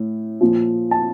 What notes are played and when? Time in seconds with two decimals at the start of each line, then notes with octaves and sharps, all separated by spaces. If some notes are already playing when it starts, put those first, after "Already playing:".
Already playing: A2
0.41 A#2 F3
0.91 A5